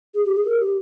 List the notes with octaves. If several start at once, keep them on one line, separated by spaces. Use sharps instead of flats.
G#4
G4
G#4
A#4
G4